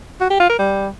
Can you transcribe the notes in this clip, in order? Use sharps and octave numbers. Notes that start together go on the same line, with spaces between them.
F#4
G4
F4
A#4
G3